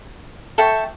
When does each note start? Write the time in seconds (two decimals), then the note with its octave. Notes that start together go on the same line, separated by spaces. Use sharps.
0.58 A4 E5 G5 C#6